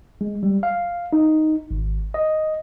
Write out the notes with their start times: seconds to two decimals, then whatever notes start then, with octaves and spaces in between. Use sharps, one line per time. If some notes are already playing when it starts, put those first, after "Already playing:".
0.21 G#3
0.43 G3
0.63 F5
1.13 D#4
1.71 G#1
2.14 D#5